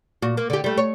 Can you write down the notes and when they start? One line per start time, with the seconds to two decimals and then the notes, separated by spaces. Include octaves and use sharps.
0.22 A#2 F#4
0.37 A#3
0.50 D3 G4
0.64 G3 A3
0.78 C#5